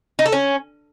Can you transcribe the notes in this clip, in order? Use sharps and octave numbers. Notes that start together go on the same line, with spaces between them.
D#4
A4
C#4